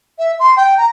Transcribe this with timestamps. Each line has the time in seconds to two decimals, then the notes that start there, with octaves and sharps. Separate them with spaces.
0.19 E5
0.40 C6
0.57 G5
0.78 A#5